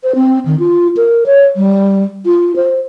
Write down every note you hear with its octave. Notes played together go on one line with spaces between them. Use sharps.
C5
C4
D#3
F4
A#4
C#5
G3
F4
C5